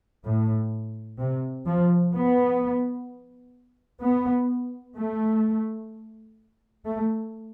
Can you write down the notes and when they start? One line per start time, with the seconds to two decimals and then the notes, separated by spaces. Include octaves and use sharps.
0.25 A2
1.19 C3
1.66 F3
2.13 B3
4.01 B3
4.96 A3
6.85 A3